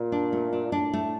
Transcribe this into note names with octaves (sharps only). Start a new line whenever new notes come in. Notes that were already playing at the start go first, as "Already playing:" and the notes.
Already playing: A#2
D4
A3
D4
A2 D4
A3